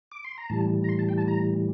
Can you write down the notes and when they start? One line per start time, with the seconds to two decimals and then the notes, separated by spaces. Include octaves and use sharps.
0.12 D6
0.24 C6
0.38 A#5
0.49 A2 E3 G3 A5
0.84 A#5
0.89 C6
0.99 A5
1.09 G5
1.18 A5
1.28 A#5